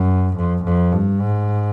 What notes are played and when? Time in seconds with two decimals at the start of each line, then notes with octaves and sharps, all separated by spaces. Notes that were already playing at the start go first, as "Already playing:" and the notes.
Already playing: F#2
0.36 F2
0.64 F2
0.92 G2
1.21 G#2